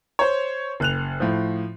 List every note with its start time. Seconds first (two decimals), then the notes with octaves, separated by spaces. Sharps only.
0.19 C5 C#5
0.80 F#1 F#6 F7
1.20 A2 F3